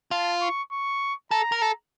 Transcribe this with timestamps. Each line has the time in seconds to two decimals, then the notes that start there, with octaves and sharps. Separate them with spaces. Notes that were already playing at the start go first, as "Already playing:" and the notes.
0.11 F4 A5
0.41 C#6
0.72 C#6
1.31 A4 A#5
1.52 A#4
1.62 A4